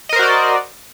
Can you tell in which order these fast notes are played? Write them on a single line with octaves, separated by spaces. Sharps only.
D#5 A#4 C5 F#4 D5